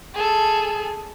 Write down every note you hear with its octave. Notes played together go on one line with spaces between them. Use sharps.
G#4 A4